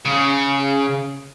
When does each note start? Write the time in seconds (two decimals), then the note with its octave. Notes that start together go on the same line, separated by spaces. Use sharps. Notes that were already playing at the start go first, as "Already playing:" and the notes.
0.05 C#3